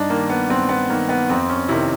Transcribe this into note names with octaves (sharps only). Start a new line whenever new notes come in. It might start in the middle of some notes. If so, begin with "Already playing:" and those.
Already playing: G2 D4 D#4
D#3 A#3
B3
G2 C4
B3
D#3 A#3
B3
F2 C4
C#4
C3 D#3 E4